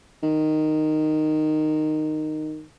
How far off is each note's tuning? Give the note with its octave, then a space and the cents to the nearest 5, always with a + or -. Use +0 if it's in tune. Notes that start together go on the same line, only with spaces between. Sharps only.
D#3 -10